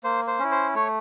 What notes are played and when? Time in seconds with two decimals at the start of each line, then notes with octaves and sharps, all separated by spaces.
0.04 A#3 C5
0.27 C5
0.39 C#4 E4
0.51 C5
0.75 A3 C#5